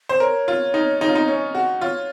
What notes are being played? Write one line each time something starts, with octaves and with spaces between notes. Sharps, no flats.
C5
A#4 C#5
F4
D#4
D#4
F4
D#4
C#4
F#4
F4 C#5